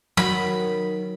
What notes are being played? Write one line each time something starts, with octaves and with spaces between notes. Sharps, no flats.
D#3 F#3 F#4 B5